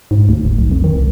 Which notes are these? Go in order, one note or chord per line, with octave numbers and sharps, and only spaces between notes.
G#2
D2
F#1
B1
F2
D#3
C2